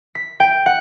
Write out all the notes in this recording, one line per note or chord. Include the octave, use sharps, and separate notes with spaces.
B6
G5
F#5